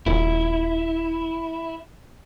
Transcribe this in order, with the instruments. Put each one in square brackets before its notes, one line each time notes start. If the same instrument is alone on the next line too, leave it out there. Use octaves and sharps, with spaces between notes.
[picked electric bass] D#1 [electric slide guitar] E4